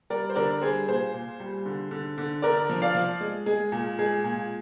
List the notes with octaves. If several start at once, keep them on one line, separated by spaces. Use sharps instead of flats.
G3 A#4 D5
C5
D3 A#4 D5
G3 G#4 C5
A#2 G#4 C5
A#2
G3
D3
D3
D3
D3 A#4 D5
F3
D5 F5
F3
G#3
G#3 G#4
A#2
G#3 G#4
A#2